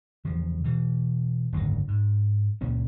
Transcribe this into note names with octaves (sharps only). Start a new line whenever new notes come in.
E2 C#3 F3
B2 E3
F#1 D2 G#2 D#3
G#2
C#2 A#2 C#3 C#4